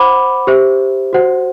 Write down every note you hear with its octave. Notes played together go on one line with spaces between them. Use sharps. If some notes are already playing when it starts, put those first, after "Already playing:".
Already playing: C5 F#5 B5 D6
G4 C5 E5
F#4 C5 F#5